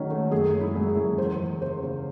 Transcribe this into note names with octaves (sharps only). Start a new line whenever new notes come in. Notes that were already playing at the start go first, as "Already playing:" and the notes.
Already playing: D#3 F#3 G#3 A3 C#4
A3
F#2 G#4
G#3
E4
F#2
G#4
F#2
E2 C5
E3
C#3 C5
C#3